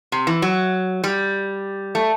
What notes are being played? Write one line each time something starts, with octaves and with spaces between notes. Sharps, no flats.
C3
E3
F#3
G3
A3